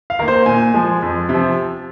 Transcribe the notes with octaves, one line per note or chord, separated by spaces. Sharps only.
F5
D#3 A#3 A#4
C5
A#2 G#5
F3 G#3
F2
C3
F3